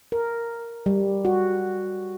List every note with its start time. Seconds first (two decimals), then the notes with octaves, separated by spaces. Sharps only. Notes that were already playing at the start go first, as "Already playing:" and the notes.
0.12 A#4
0.86 G3
1.25 F#4